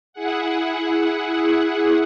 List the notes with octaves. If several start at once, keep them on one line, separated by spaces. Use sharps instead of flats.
E4 G#4 F#5